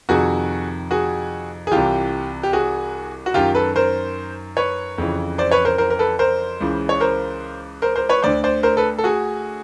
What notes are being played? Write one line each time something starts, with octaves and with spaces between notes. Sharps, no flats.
F2 C3 D#3 F#4 G#4
F#4 G#4
G#4
C2 C3 E3 F4 G4
G4
F#4 G#4
F#4
F#2 D#3 F4 G4
A4 B4
A#4 C5
B4 C#5
F2 C#3 E3
C5 D5
B4 C#5
A#4 C5
A#4 C5
A#4
A4 B4
A#4 C5
C#2 C#3 E3
C#5
A#4 C5
A#4 C5
A#4 C5
B4 C#5
D2 D3 C5 D5
C5 D5
A#4 C5
A4 B4
A4
F#4 G#4